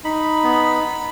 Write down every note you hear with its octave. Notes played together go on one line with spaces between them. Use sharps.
D#4 B5
B3